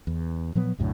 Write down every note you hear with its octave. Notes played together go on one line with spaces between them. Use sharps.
E2
A#2 F3 F#3 B3
B1 F#2 A2 D3